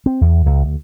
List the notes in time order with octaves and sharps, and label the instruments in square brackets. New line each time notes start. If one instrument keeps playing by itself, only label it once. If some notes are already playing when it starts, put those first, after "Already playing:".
[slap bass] C4
E2
C#2
D2